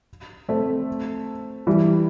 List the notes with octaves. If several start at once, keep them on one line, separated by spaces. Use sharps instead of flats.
A3 C4
E3 G3